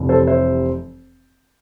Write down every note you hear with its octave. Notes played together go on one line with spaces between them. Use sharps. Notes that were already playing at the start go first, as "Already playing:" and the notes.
Already playing: F1 F2 E3 G3
A4 C5
C5 E5